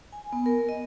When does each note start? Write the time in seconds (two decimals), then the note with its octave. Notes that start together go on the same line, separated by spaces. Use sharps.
0.12 G#5
0.32 B3
0.46 A#4
0.69 D#5